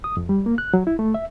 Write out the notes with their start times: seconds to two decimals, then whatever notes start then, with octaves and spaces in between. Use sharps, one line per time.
0.04 D#6
0.17 F2
0.29 G3
0.46 A#3
0.58 F#6
0.74 F#3
0.87 E4
0.99 A3
1.14 E5